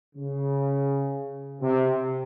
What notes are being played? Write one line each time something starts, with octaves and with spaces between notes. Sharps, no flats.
C#3
C3